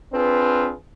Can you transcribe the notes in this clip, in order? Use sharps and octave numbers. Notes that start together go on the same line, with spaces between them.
C4 D4 F4 G#4 B4